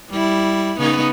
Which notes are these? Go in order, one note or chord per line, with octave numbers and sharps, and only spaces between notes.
G3 E4
C#3 B3 D#4